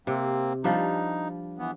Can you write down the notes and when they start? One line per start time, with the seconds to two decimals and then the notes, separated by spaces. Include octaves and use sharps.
0.07 C3 A#3 C4
0.64 F3 G3 D4 D#4
1.58 E3 B3